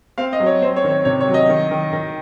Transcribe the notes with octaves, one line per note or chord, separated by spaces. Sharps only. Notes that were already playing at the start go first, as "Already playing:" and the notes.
C4 F5
D#5
F#3
C#5
C4 C5
C#5
D#3
C#5
C3 C#5
C#5
F#3
D#5
D#3
D#3
D#3